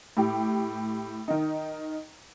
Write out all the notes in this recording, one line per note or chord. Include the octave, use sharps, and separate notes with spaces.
A2 G4
D#3 D#4